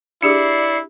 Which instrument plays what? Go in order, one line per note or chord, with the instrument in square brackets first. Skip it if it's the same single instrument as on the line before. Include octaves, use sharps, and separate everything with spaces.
[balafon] D4 G4 G#4 [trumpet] E4 [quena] D5 [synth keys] C7 C#7